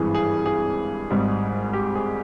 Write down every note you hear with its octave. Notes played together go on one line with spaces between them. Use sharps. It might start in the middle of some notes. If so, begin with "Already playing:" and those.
Already playing: G#1 G2 E3 G#4
G#4
G#4
G#1 G#2 G3
G4
G#4